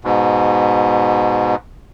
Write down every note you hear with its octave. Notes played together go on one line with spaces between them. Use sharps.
G#2 B2